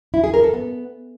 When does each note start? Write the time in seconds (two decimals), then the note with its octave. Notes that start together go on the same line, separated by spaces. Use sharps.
0.14 E4
0.24 G#4
0.34 A#4
0.44 A4
0.54 B3